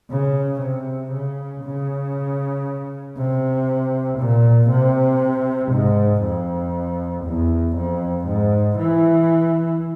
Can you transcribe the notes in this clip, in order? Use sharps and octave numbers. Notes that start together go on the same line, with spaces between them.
C#3
C3
C#3
C#3
C3
A#2
C3
G#2
F2
E2
F2
G#2
E3